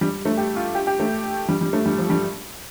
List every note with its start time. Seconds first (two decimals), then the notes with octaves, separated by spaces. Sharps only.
0.01 G3
0.25 A3
0.38 G4
0.56 F4
0.75 G4
0.87 G4
1.00 A3
1.49 G3
1.61 G3
1.73 A3
1.86 G3
1.98 F3
2.10 G3